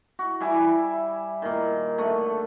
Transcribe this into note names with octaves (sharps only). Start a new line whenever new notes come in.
F#4
G3 E4 G#5
A#2 D#3
D3 A3